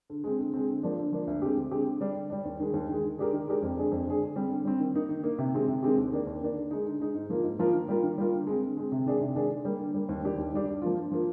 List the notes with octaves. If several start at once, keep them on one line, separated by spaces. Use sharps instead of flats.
D3
G#3 C4
D3
G#3 C4
D3
F3 A#3 D4
D3
F3 A#3 D4
D2
D3 G#3 C4 G4
D2
D3 G#3 C4 G4
D3
G3 D4
D3
G3 D4
D#2
D#3 G#3
D#2
D#3 G#3
D#3
G#3 D4 G4 A#4
D#3
G#3 D4 G4 A#4
F2
D3 G#3 D4 G#4
F2
D3 G#3 D4 G#4
D3
G3 C4
D3
G3 C4
D#3
A#3 D#4
D#3
A#3 D#4
C3
D#3 G#3 C4 G4
C3
D#3 G#3 C4 G4
D#2
D#3 A#3 D4
D#2
D#3 A#3 D4
D3
G#3 D#4
D3
G#3 D#4
G#2
F3 A#3 F4 A#4
G#2
F3 A#3 F4 A#4
D#3
G3 A#3 F4 A#4
D#3
G3 A#3 F4 A#4
D3
G#3 C4
D3
G#3 C4
C3
D#3 G#3 D4 G#4
C3
D#3 G#3 D4 G#4
D3
G3 A#3
D3
G3 A#3
D#2
D#3 G3 D4 G4
D#2
D#3 G3 D4 G4
G2
F3 A#3 F4
G2
F3 A#3 F4